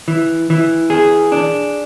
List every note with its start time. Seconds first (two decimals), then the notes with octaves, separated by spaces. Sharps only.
0.08 E3
0.50 E3
0.90 G#4
1.32 D4